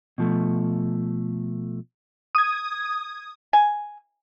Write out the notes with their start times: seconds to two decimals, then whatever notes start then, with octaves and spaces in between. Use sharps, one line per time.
0.18 B2 F3 A3
2.35 D#6 G#6
3.53 G#5